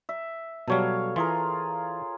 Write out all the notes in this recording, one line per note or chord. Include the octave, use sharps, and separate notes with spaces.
E5
B2 F#3 G3 A4 C#5 F5
E3 F4 G#4 A#4